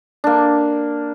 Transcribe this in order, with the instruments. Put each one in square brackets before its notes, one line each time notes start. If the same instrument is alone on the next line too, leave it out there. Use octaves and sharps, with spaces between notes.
[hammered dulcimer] A#3 D4